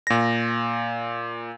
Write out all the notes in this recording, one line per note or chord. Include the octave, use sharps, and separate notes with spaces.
A#2 A#6